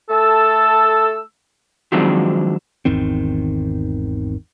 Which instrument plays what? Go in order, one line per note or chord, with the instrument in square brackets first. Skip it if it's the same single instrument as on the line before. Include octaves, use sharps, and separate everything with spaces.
[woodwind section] A3 A4 A5 E6
[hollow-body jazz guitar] D#3 F3 F#3 G#3 C4 D4
[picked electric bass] G#1 E2 D#3 C4